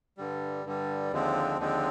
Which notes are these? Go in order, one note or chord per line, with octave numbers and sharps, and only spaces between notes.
G2 D3 G3
G2 D3 G3
D#2 D3 F3 G#3 C4
D#2 D3 F3 G#3 C4